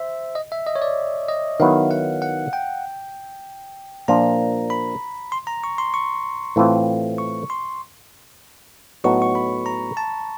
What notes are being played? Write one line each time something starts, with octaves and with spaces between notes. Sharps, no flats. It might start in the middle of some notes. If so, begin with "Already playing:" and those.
Already playing: C5 E5
D#5
E5
D#5
C#5
D5
D#5
D#3 F#3 B3 E4 F5
F#5
F#5
G5
A#2 F3 A#3 D4 F4 A#5
B5
C6
A#5
C#6
C6
C#6
A2 E3 A3 C4 F4
C#6
C6
A2 F#3 B3 D#4 F#4 C#6
C#6
B5
A#5
A5